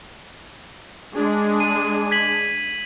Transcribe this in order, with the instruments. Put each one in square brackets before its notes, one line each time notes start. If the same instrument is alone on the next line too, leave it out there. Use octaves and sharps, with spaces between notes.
[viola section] G#3 D4 G#4
[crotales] D#7
G#6 B6 F#7